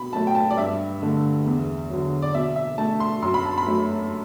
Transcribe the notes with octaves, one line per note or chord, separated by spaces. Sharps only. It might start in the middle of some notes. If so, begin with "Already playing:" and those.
Already playing: B2 B5
F#3 A3 A5
G5
A5
D5
G2 E5
D3 A3
E2
D3 F#3
D5
B2 E5
E5
A3 A5
C6
F#2 C6
B5
A5
B5
F#3 A3